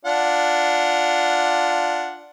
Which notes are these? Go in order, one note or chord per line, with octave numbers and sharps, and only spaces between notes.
D4 F4 F#5